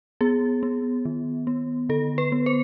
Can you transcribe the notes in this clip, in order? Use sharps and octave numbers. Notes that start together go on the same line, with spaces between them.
B3 G#4
B3
D#3
B3
D3 A4
B4
B3
C5